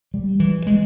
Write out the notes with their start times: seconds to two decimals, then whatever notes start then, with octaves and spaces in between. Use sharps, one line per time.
0.14 G3
0.40 E3
0.67 G#3